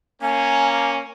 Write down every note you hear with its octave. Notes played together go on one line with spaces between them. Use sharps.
A#3 C#4 G#5